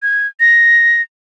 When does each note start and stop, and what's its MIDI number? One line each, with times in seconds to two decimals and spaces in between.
0.03 0.27 92
0.40 1.01 94